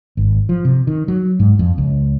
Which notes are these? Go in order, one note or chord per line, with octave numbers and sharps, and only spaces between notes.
G#1
F3
C3
D#3
F#3
G#2
F2
C#2